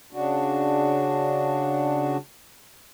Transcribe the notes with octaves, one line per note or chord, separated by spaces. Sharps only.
C#3 D4 F#4